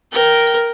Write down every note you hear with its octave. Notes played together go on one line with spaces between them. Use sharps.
A#4 G5